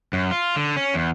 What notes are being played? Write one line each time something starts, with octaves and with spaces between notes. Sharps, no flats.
F#2
F4
D3
C#4
E2